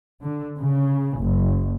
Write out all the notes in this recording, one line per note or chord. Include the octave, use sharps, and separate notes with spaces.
D3
C#3
F#1